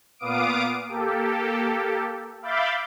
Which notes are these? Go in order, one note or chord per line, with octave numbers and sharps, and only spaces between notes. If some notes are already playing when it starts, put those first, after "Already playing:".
A#2 B3 F5 D6 D#6 D7
A#3 G4 A4
E5 F5 B5 D6 G6 A6